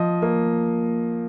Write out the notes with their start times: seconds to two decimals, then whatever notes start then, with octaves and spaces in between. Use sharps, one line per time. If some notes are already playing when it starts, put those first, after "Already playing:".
Already playing: F3 D#5
0.22 A#3